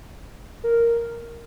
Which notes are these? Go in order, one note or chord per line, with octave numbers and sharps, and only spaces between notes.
A#4